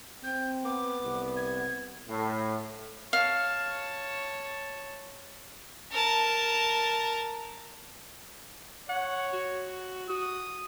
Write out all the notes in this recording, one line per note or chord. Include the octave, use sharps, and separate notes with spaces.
C4 G6
B3 D6
C2
G#6
A2
C#5 F5 A5
A#4 A5
C#5 F#5
F#4
F#4 D#6